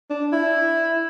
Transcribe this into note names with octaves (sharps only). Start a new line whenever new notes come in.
D4
E4